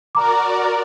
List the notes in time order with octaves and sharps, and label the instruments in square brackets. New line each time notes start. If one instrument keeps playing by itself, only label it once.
[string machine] F#4 A#4 D5 [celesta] A#5 D6